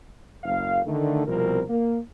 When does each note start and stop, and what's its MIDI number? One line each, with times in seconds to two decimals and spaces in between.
0.43 0.80 30
0.43 0.80 77
0.86 1.25 50
0.86 1.25 51
0.86 1.25 57
1.27 1.62 36
1.27 1.62 47
1.27 1.62 53
1.27 1.62 60
1.27 1.62 70
1.68 1.97 58